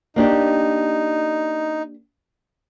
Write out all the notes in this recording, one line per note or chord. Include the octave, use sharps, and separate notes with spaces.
A#3 D4 D#4 G4